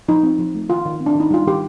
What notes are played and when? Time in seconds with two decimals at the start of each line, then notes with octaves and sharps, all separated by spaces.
0.08 F3 D#4
0.23 C4
0.39 F3
0.55 A3
0.70 D#3 F4
0.85 D#3
1.00 C4
1.06 D4
1.15 D#3 D#4
1.31 G3 F4
1.47 D#3 G4